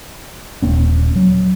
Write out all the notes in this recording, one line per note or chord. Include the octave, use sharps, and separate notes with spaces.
D#1 A#3 C#4
F#3